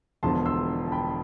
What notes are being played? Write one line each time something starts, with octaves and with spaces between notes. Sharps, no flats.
E1 E2 D3 F3 A5 C6
C6 E6
A5
G5 B5